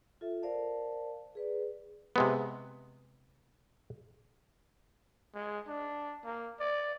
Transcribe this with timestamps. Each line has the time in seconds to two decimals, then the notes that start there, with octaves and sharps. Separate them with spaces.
0.21 F4 A4 E5
0.43 A#4 C5 D5 F5 A5
1.35 G#4 B4 D5
2.16 C3 G#3 B3
5.35 G#3
5.68 D4
6.24 A#3
6.60 D5